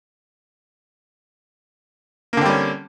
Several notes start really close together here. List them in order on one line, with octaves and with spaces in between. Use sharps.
A#3 D3 C4 G3 C#4